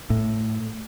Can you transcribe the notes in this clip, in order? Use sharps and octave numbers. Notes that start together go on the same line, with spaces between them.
A2